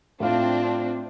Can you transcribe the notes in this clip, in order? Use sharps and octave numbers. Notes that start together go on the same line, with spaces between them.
A2 C4 D4 F4